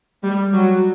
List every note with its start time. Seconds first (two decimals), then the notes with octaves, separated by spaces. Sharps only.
0.23 G3
0.53 F#3